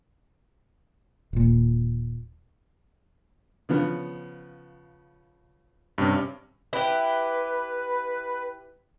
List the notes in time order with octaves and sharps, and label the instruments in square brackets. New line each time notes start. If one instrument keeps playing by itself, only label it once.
[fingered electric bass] D#1 A#2
[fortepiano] C#3 F3 B3
[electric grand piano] G2 C3 C#4
[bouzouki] E4 G4 [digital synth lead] B4